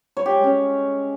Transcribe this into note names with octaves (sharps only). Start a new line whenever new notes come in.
C#5
G4
G#3
C#4